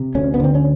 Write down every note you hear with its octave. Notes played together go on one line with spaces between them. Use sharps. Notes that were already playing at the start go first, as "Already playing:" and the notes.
Already playing: C3
D2 C#4
B3
D3 C4
C#4